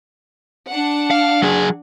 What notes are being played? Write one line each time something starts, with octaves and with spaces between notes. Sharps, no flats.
D4 F#5
F5
F#3 G#4